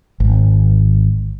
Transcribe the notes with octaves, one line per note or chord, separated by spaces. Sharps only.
G#1